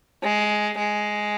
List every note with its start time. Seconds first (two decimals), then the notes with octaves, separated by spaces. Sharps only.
0.23 G#3
0.78 G#3